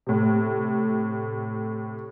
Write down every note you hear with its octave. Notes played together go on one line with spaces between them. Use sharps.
A2 C3